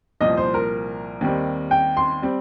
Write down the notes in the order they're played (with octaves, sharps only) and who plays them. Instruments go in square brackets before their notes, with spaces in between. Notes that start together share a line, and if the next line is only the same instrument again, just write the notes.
[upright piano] C2 A#2 F3 D#5
C5
A#4
D#2 D#3 G3 C4
G5
C6
G3 C4